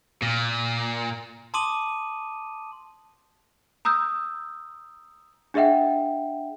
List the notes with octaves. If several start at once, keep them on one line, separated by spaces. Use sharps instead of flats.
A#2
A5 C6 D6 D#6 D#7 F#7
A#5 D#6 E6 G6
D4 G#4 D#5 E5 F#5 G5